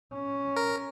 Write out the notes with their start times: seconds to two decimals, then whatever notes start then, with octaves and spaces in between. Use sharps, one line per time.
0.13 C#4
0.56 A#4